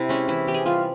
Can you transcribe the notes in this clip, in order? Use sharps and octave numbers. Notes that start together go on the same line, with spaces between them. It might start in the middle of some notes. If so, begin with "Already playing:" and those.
Already playing: C3 E4
G#3 C#4
E3 E4
E3 G4
G#4
G3 F4